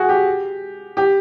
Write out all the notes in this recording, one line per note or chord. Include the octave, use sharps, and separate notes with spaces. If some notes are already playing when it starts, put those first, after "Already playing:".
Already playing: F#4 G#4
G4
G4